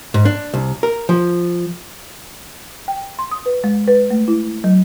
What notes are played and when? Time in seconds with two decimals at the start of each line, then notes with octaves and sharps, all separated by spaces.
0.14 G#2
0.25 D4
0.54 C2
0.83 A#4
1.09 F3
2.88 G5
3.19 C6
3.31 D#6
3.46 B4
3.64 G#3
3.88 B4
4.11 A3
4.28 E4
4.64 F#3